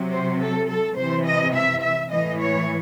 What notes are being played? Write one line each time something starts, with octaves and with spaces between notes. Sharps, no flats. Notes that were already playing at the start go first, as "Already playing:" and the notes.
Already playing: C3 F#3
C5
A4
A4
C3 E3 C5
D#5
E5
E5
A2 E3 D#5
C#5